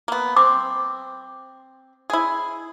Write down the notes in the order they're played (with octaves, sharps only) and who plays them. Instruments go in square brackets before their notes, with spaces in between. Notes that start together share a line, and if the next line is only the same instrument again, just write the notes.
[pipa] A#3 B3
[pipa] C4 [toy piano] D6
[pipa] E4 G#4